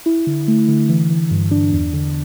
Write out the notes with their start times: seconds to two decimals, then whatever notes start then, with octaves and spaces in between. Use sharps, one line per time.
0.06 E4
0.27 D3
0.48 A3
0.68 D3
0.89 E3
1.10 E3
1.31 G2
1.51 D4
1.72 E2
1.93 D3